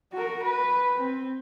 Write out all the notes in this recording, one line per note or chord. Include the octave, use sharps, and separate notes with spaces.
F#4 A#4
B4
C4